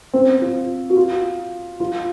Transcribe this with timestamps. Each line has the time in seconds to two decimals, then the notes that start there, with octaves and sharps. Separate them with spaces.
0.13 C4
0.41 F4
0.90 F#4
0.97 F4
1.80 F4